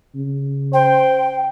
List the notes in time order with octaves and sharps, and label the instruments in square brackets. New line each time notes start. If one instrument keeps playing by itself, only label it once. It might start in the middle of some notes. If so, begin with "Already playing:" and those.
[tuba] C#3
[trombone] C5 [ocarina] G5